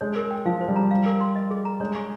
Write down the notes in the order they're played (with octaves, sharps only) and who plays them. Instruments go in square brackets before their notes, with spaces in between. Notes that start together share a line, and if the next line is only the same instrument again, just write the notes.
[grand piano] G#3 [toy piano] C#5
[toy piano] A#4
G5
[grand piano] F3 [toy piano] F5
[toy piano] C5
[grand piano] G3
[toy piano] A#5
F5
A#4
C6
D#5
G#4
A#5
[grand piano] G#3 [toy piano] C#5
[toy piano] C#6